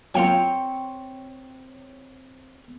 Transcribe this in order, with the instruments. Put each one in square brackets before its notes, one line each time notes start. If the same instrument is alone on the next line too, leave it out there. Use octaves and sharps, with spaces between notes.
[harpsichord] F#3 A#3 F4 [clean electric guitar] C4 C#5 G5